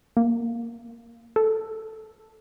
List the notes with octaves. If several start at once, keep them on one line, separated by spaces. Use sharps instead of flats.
A#3
A4